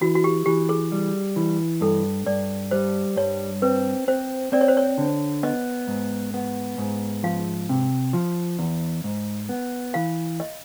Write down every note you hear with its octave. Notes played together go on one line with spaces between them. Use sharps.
E3 F#4
F#4
G4
E3 G4
G#4
G3
E3
G2 A4
G2 D5
G3 C5
G2 C#5
C4 B4
C4 C5
C4 D5
C#5
C5
C#5
D3
B3 D#5
G#2
B3
G#2
F3 F5
C3
F3
E2
G#2
B3
E3 F5
D#5